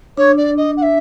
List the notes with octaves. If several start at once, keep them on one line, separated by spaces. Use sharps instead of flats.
D4 C#5
D5
D#5
F#5
E5